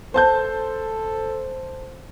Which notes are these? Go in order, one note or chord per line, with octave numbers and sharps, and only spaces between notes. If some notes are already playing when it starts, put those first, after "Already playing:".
A4 C5 A5 G6